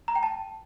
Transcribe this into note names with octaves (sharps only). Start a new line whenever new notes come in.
A#5
G5
A5